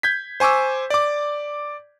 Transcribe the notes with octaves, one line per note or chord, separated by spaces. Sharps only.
G6 G#6 B6
C5 G#5 C#6 D6 E6
D5 D6